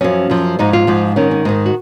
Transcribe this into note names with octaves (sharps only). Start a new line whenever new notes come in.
F#2 F3 C#4
F#2 F3
G#2 F3 D#4
F4
G#2 F3
G#2 D#3 C#4
C#4
G#2 D#3 D#4
F#4